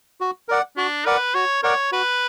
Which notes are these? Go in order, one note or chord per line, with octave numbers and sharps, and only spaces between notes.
F#4
A#4 D5 F#5
D4 F#4
A#4 B4 D5 F#5
F#4 C#5
A#4 C#5 D5 F#5
F#4 B4